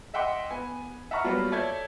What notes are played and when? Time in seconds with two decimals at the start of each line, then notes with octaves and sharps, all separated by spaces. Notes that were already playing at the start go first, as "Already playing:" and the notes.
0.14 D#5 E5 F#5 G5 C6 D6
0.50 B3 G#5
1.11 E5 F#5 A5 A#5 C#6 F6
1.25 F#3 G3 A#3 B3 F4
1.52 A4 C#5 D5 E5 G6 G#6